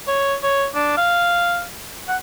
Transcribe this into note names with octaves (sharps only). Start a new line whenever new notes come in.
C#5
C#5
D4
F5
F#5